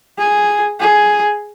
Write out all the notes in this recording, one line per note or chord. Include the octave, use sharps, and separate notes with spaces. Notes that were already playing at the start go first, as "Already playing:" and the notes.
G#4
G#4